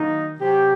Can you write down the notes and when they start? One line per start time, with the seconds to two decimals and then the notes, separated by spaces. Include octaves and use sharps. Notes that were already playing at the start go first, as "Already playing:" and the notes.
Already playing: D#3 F#3 A#3 D#4
0.39 C3 F#3 C4 G4